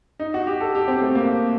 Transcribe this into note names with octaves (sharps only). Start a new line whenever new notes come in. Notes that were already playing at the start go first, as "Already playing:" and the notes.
D#4
F#4
G4
A4
G4
C4
A3
A#3